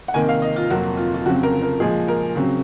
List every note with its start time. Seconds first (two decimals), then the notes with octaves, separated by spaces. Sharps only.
0.08 F#5
0.14 C3 D#3 A#3 G#5
0.29 F5
0.42 D#5
0.56 F4
0.70 F2 C3 F#3 A#3 F#4
0.97 F4
1.14 F4
1.25 F2 C#3 F#3 C4 F#4
1.43 A#4
1.62 A#4
1.80 A#2 F3 G#3 G#4
2.08 A#4
2.35 C#3 F#3 C4